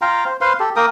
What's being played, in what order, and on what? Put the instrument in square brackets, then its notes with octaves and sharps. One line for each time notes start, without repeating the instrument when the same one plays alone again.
[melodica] F4 F5 G5 A#5
C5
B4 C5 F5 C6
G4 A4
A#3 A#4 G5 D#6